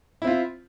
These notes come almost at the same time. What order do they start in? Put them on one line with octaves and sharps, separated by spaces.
E4 C4 F4